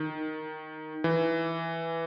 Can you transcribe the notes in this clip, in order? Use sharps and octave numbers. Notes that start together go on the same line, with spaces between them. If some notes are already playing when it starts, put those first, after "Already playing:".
Already playing: D#3
E3